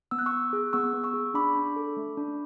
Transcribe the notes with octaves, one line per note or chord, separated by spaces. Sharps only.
B3 E6
F#6
C#6 E6
B3
G#4
B3 C#6 E6
B3
C#6 E6
G#4
D4 B5 D6
D4
A4
A3
D4